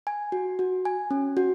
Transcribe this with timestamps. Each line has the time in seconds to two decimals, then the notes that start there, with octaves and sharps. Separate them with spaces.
0.07 G#5
0.32 F#4
0.59 F#4
0.85 G#5
1.11 C#4
1.37 F#4